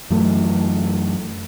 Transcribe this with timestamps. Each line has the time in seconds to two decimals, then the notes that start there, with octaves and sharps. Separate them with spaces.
0.10 F#2 E3 F#3 A3